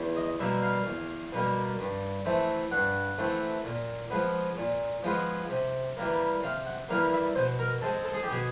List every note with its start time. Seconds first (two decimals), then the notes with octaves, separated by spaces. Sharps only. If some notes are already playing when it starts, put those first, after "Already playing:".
Already playing: E2
0.17 D#5
0.40 B2 G3 A#3 E5
0.62 F5
0.87 E2
1.32 B2 G3 A#3
1.79 G2
2.25 E3 A3 C4
2.71 G2 F#5
3.18 E3 A3 C4
3.65 A#2
4.10 F3 G#3 B3
4.57 A#2
5.03 F3 G#3 B3
5.50 C3
5.97 E3 G3 A#3
6.42 C3 F5
6.66 F#5
6.89 E3 G3 A#3 F5
7.13 E5
7.36 B2 C5
7.59 A#4
7.81 G#3 C4 A4
8.05 A4
8.14 G#4
8.23 G4
8.29 B2 G#4